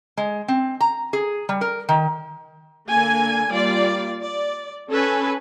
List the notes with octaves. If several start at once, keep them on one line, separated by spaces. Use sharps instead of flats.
G#3
C4
A#5
G#4
G3
A#4
D#3
D3 A#3 G#5
G3 A#3 F4 D5
D5
C#4 A4 B4 G#5